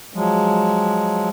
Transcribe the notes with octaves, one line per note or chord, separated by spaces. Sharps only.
F3 F#3 G#3